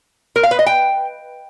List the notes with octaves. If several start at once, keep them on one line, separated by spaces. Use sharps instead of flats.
A#4
F5
B4
D#5
G5